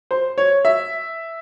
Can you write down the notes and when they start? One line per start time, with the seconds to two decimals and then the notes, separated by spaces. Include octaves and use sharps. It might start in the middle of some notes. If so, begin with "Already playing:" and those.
0.11 C5
0.38 C#5
0.65 E5